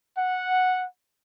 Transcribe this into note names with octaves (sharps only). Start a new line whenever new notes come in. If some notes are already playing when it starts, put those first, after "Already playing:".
F#5